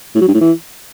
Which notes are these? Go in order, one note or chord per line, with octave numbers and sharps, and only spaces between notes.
A2
F#3
G2
A2
E3